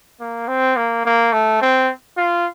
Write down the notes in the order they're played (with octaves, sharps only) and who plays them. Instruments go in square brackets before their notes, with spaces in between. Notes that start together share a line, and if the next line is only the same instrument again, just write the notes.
[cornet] A#3
C4
A#3
A#3
A3
C4
F4